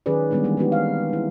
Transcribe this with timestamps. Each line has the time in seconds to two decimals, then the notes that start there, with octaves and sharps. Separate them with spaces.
0.06 D#3 F#3 C#4 G#4 B4 D5
0.31 D#3 G3 G#3 B3 D4 F4
0.44 E3 G3 G#3 A#3
0.57 B3 C4 D#4 F#4 G4
0.72 F5
1.09 E3 E4